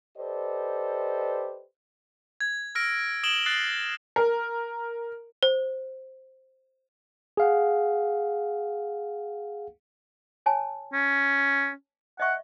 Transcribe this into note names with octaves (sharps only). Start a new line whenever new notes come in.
G4 A4 B4 C5 D5 D#5
G#6
E6 F6 A#6 D7
D#6 D7 E7 F#7 G7
D#6 F#6 A6 C7
A#4
C5
G#4 F5 F#5
C#5 G#5 A5
C#4
D#5 E5 F#5 C#6